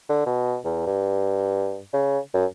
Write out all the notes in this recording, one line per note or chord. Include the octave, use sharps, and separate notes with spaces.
D3
B2
E2
G2
C#3
F#2